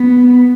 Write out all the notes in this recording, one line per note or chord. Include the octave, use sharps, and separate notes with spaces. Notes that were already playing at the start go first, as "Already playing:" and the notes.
Already playing: B3